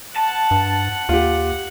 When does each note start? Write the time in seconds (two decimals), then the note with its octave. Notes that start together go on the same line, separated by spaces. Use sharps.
0.16 F#5 A5
0.51 G2
1.09 D#2 F4 G4